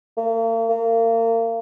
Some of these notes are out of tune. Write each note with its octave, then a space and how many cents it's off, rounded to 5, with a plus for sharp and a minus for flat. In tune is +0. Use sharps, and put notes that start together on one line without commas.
A#3 -45
A#3 -35